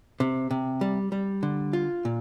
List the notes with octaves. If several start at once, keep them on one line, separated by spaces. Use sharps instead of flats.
C3
C3
G3
G3
D3
F4
A#2